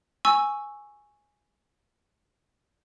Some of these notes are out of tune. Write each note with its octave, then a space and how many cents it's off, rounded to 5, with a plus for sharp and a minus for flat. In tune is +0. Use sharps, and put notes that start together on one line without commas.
G#5 +0 C#6 +0 E6 +0